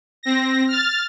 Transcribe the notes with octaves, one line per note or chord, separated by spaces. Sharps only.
C4 A#6
F6 A6